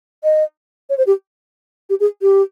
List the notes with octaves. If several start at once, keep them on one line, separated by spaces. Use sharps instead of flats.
D#5
C#5
C5
G4
G4
G#4
G4